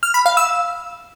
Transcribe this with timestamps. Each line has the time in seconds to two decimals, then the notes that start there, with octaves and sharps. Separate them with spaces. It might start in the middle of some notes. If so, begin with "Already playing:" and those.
0.03 F6
0.14 B5
0.26 F5
0.37 E6